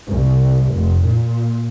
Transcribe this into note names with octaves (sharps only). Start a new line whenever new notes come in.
C2
F1
A#2